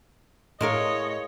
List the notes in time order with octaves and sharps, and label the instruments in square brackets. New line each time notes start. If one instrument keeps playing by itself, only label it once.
[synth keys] A2 [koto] G#3 A#4 F5 [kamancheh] C#5 D#5